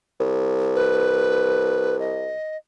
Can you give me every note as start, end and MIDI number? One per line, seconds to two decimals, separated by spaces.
0.20 2.35 36
0.75 1.99 71
2.00 2.57 75